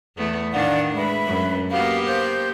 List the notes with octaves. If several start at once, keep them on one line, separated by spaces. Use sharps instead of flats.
E2 A3 B3
A2 D#3 D4 D5 F5 F#5
G#3 B4 E5 B5
F#2
A#3 B3 F#4 G4 F5
C5 G6